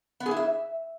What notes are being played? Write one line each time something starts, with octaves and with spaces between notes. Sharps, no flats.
B3
G#4
E4
E5